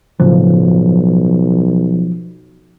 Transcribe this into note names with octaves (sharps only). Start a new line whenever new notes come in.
B1 A2 C#3 F3 F#3